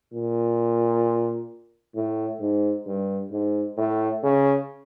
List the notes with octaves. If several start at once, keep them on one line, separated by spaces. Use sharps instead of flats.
A#2
A2
G#2
G2
G#2
A2
C#3